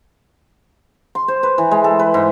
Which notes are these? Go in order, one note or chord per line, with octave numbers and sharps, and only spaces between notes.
C6
C5
B4
E3
G#3
A4
B4
G#2